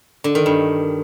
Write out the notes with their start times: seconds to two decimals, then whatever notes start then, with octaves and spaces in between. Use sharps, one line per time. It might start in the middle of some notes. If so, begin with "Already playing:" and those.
0.24 D3
0.35 D#3
0.46 G2